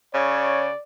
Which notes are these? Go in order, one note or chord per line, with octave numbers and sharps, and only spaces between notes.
C#3 C#5 D5